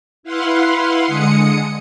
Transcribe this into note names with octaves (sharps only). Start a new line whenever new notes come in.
E4 B4 F5 F#5 C6
D3 G#3 D#6 C#7